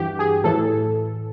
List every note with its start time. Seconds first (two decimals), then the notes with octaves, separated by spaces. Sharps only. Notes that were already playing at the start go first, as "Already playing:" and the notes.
Already playing: G2 E3 F#4 G4
0.19 G#4
0.44 A2 E3 A4